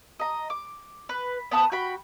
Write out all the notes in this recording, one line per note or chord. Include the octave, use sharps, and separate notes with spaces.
D#5 A#5
D6
B4
B3 B4 A5 D#6
F#4 G5 B5